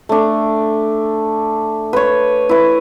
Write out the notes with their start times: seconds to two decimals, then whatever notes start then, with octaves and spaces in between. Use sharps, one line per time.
0.09 A3 D4
1.93 B4 C#5
2.49 E4 B4